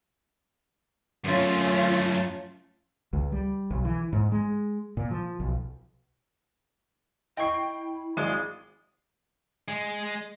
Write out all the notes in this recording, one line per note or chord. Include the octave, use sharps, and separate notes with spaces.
F#2 A3 C#4 F4
C#2
G3
B1
E3
G#2
G#3
A#2
F3
B1
E4 D#5 G5 C#6 C7
G#1 G#3
G#3